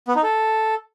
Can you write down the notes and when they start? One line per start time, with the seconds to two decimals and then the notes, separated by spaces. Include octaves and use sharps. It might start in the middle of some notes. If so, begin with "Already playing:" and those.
0.08 B3
0.16 D#4
0.23 A4